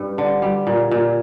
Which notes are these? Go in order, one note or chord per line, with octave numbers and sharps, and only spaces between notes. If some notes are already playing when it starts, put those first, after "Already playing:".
Already playing: G2
D3
G3
A#2
A#2